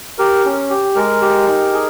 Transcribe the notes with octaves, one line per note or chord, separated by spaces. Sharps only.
G4 A#4
C#4
G4
G#3 A#4
G4
D#4
G#4